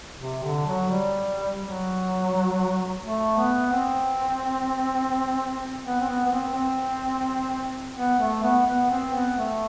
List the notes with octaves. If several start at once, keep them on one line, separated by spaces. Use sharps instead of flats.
C3
D3
F#3
G3
F#3
A3
B3
C4
B3
C4
B3
B3
C4
C4
B3
A3
B3
B3
C4
B3
A3